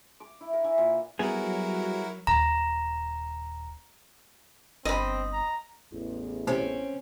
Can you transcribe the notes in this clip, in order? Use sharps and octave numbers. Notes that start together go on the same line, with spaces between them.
D6
E4
A#4
E3
A#2
F#3 G3 B3 E4 F#4 G#4 A#4
D#1 A#5
G1 C4 D#5 B5
A#5
A1 E2
C3 C4 C#4